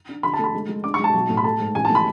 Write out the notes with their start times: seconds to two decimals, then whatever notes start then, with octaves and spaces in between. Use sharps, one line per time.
0.09 D4
0.23 D3 B5
0.33 A5
0.39 A3
0.44 B5
0.54 G#3
0.69 G#3
0.84 D4 D6
0.94 C#6
0.99 G#3
1.04 A5
1.14 B1
1.30 A2
1.37 B5
1.44 A3 A5
1.60 G#2
1.75 A1 G#5
1.85 A5
1.90 A2
1.95 B5